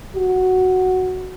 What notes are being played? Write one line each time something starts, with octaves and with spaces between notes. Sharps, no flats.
F#4